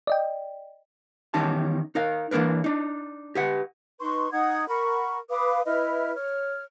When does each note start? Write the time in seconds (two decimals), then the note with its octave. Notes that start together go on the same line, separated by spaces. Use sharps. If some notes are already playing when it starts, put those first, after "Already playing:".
0.07 D5 D#5 G5
1.34 E2 D#3 C#4 D#4 G4 A5
1.95 D#4 A#4 F5
2.31 E3 A#3 D4 A#4 B4
2.64 D4 D#4
3.35 G4 B4 F#5
4.00 D#4 B4 C6 C#6
4.32 D#4 F#5 D#6 G#6
4.68 A#4 F#5 B5 C#6
5.30 B4 F5 D6 D#6
5.65 E4 B4 D#5 F6
6.14 C#5 F6